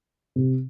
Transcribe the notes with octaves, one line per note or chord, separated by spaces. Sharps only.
C3